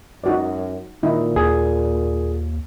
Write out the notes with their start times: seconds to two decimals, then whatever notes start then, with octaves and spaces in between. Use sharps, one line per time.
0.24 F#2 D#4 F#4 D5
1.03 A#2 D#3 D#4 E4
1.36 D#2 G#4